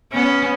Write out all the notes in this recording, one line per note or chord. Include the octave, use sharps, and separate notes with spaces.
B3 C#4